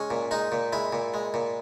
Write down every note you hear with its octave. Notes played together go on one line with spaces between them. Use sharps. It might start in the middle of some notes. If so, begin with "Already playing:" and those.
Already playing: G#3 C#4
A#2
G#3 D#4
A#2
G#3 E4
A#2
G#3
A#2